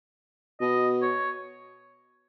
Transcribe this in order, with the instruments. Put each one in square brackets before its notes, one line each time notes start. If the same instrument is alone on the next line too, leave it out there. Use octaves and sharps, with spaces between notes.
[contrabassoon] B2 [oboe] D#5
[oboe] C#5